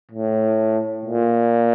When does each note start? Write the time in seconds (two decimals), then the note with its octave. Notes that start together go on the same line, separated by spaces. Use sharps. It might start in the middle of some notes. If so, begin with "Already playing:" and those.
0.12 A2
1.05 A#2